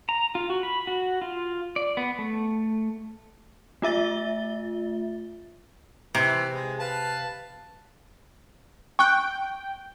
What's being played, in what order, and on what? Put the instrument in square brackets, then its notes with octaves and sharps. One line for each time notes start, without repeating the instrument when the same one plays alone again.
[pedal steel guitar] A#5
F4
F#4
B5
F#4
F4
D5
B3
A3
[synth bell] A3 F4 E5 A6 G7
[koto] C3 [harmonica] E3 B4
[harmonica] G#3
B4 F5 A5
[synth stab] G5 [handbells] C#6 F#6